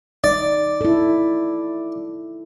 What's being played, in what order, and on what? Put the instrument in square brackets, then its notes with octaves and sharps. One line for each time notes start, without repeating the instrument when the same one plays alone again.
[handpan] D#4 [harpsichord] D5
[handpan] E4 A4